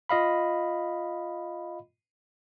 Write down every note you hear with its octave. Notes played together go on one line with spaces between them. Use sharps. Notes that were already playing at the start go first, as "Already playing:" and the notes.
F4 D#5 F5 B5